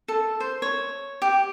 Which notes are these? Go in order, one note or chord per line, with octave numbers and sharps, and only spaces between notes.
A4
C5
C#5
G4